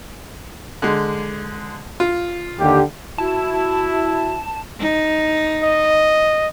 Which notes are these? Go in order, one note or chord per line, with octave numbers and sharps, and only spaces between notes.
D3 G#3
F4
D#2 D3 G4
E4 F#4 A5
D#4
D#5